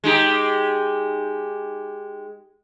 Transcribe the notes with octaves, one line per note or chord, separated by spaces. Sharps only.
G#3 D#4 G4